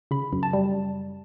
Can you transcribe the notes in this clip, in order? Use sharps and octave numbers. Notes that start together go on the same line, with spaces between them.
C#3 B5
F#2
A5
G3